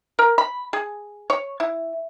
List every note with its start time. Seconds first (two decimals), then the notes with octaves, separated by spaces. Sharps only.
0.19 A#4
0.38 B5
0.73 G#4
1.30 C#5
1.60 E4